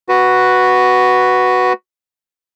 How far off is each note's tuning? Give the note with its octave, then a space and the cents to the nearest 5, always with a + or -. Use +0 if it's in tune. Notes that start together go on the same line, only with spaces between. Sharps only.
F#4 +0 B4 +0